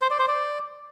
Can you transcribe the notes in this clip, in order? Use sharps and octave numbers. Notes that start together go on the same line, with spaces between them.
C5
D5
C5
D5